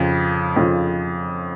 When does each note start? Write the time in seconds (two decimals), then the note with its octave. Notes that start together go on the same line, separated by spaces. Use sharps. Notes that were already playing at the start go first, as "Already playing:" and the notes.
Already playing: F2 C#3 F3
0.56 F2 C#3 F3